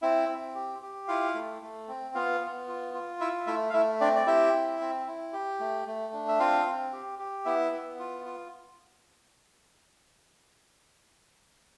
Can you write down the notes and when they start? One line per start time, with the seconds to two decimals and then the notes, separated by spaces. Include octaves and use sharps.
0.02 C4 E4 E5
0.29 C4
0.55 G4
0.82 G4
1.08 E4 F4 F5
1.35 A3
1.62 A3
1.88 C4
2.15 B3 F4 F5
2.41 B3
2.68 F4
2.94 F4
3.20 E4 E5
3.47 A3 E4 E5
3.70 F5
3.74 A3 E4 E5
4.01 C4 D4 D5
4.16 D5
4.27 E4 G4 E5
4.53 C4
4.80 C4
5.07 E4
5.33 G4
5.60 A3
5.87 A3
6.13 D4
6.28 E5
6.39 C4 F4 F5
6.66 C4
6.93 G4
7.19 G4
7.45 B3 E4 E5
7.72 B3
7.99 F4
8.25 F4